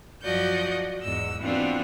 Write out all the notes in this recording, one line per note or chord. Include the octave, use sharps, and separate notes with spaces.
F#2 F3 F#4 D5 D#5 G6
E2 G#2 E6
E3 B3 C4 D4 F4 F#4